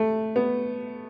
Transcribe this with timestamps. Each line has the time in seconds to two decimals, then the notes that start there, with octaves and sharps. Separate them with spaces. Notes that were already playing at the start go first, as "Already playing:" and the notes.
Already playing: A3
0.36 B3